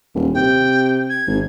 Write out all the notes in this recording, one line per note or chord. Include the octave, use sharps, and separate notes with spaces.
D#1
C3 G5
G#6
G#1